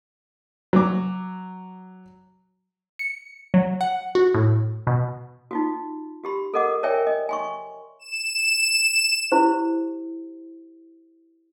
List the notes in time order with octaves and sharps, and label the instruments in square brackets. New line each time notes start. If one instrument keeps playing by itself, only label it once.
[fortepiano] F#3 D6
[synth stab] C#7
F#3
F#5
F#4
A2
B2
[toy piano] D#4 F4 F#4
F#4 G4 B5
A4 A#4 D#5 F#5 D6
A#4 C#5 D5 E5 G5 G#5
D#5
G#5 C6 C#6
[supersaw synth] E7
[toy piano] E4 G4 C5